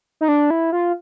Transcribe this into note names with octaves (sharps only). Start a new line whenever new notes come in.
D#4
D4
E4
F4